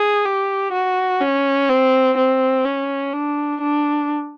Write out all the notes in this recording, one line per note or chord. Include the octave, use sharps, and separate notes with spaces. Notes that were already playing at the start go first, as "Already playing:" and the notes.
Already playing: G#4
G4
F#4
C#4
C4
C4
C#4
D4
D4